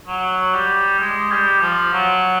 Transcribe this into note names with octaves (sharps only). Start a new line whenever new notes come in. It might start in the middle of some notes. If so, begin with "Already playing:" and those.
F#3
G3
G#3
G3
F3
F#3